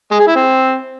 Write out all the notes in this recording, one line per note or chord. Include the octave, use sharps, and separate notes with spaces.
G#3
G#4
E4
C4